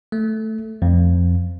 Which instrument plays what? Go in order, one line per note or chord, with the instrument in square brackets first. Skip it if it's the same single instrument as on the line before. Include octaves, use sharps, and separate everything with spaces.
[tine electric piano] A3
F2